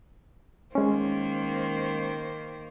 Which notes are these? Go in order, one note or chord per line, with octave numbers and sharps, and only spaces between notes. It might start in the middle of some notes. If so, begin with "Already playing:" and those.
D#3 G#3 A#3 C#4 C5